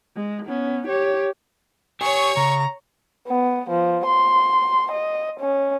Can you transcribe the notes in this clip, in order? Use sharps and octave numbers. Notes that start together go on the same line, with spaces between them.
G#3
B3 C#4
G4 C#5
G4 C#5 G#5 C#6
C#3 A#5
B3
F3
C6
D#5
C#4